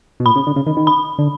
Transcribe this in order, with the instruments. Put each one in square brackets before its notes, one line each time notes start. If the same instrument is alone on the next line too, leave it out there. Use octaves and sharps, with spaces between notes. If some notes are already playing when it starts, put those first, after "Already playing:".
[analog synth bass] B2
[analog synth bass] A#2 [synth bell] B5
[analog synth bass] C#3
D3
C#3
D#3
D#3
[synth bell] B5
[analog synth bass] D3